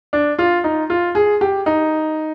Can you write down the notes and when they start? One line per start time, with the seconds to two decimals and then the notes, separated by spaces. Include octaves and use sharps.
0.13 D4
0.39 F4
0.64 D#4
0.90 F4
1.15 G#4
1.41 G4
1.66 D#4